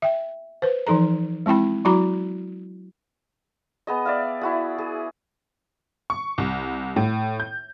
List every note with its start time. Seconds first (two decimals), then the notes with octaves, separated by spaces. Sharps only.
0.02 E5 G5
0.62 B4 C5
0.87 E3 F3 D#4 A4 A#5
1.46 G#3 C4 E4 G5 B5
1.85 F#3 E4 F#4 A#5 B5 D6
3.87 B3 G#4 D#5
4.05 D5 E5 F5
4.41 E4 F#4 G#4
4.78 G#4
6.10 C#6
6.38 C2
6.96 A2
7.40 G6